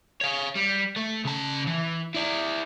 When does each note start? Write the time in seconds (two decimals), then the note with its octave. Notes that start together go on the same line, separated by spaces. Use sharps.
0.21 C#5 F5
0.55 G3
0.96 A3
1.25 C#3 A5
1.67 E3
2.15 E4 D5